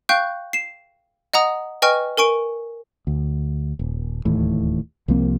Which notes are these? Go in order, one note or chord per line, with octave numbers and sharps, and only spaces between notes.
F5 G5 C#6 F#6 G6
C7 E7
D#5 F#5 A#5 D#6
B4 D#5 G5 G#5 C#6 F6
A#4 G#5 C#6 D7
D2
D#1
D1 D#2 A2 E3
C2 F3 A#3 C4